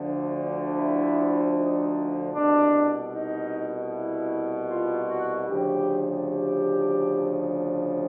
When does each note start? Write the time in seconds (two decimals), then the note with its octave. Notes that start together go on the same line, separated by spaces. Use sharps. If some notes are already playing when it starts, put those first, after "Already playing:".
Already playing: D2 D3 F3
0.75 E4
1.54 D#4
2.33 C2 B2 D4
3.12 D#4
3.90 E4
4.68 F4
5.08 F#4
5.47 D2 C#3 F3 G4
6.26 G4